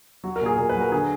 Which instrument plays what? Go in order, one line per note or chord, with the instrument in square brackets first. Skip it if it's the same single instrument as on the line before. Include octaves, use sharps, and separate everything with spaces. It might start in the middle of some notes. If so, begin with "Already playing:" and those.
[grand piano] F#3 F#4
A#4
A#2 G#4
A#2 A#4
B4
F#3
A#4
D3 G#4